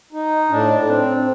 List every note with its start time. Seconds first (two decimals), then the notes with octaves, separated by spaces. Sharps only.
0.12 D#4
0.50 A2 D4
0.87 C4